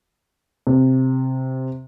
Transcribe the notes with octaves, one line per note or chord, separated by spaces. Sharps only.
C3